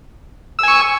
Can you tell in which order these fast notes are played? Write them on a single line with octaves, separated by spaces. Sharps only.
E6 G#5 C#6